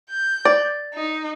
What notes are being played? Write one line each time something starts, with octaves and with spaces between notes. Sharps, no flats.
G6
D5
D#4